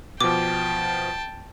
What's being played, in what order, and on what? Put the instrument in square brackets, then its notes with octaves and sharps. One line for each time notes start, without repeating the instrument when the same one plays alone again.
[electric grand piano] B2 F3 [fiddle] G5 A5 [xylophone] D6